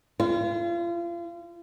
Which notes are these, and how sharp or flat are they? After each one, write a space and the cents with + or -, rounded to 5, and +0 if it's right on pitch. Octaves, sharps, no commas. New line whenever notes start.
F4 -35